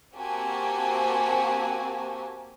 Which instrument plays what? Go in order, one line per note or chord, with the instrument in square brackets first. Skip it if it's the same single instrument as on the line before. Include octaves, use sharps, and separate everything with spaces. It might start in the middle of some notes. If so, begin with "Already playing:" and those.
[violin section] A#3 C4 F#4 G4 G#5 A5